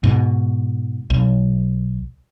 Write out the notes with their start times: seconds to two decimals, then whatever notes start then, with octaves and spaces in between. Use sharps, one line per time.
0.04 G#2 B2
1.10 B1